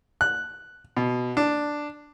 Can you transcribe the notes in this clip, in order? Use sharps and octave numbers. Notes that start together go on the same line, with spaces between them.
F#6
B2
D4